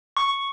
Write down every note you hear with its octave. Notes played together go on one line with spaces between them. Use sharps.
C#6